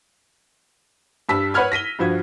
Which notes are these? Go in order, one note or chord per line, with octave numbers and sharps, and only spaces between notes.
G2 G3 A5 E6 B6
B4 C#5 F#5 B5 F6 G#6
A#6 B6 D#7 G7
G2 F3 F#4 G#6